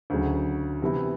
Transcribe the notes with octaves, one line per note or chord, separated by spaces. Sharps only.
D2 C#3 F#3
C3 E3 G3 B3 E4